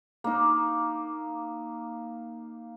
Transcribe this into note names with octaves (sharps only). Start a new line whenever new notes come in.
A#3 D#4